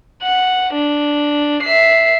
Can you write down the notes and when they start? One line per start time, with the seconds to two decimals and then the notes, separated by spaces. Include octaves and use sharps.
0.22 F#5
0.74 D4
1.63 E5 C7